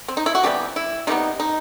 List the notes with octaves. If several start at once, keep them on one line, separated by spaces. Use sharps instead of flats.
C4
D#4
E4
F#4
C3 E3 G3 B3 G4
E4
C3 E3 G3 B3 D#4
D#4